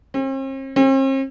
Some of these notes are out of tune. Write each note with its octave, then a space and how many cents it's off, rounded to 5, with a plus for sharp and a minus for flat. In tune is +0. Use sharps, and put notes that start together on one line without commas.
C4 +45
C4 +45